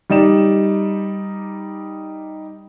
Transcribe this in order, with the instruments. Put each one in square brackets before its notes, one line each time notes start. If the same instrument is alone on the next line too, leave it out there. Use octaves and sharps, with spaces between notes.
[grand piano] G3 D#4 D5 E7